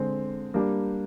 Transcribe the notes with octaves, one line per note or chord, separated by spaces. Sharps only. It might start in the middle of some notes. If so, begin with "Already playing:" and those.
Already playing: D3 G#3 C4
G3 A#3 D4 G4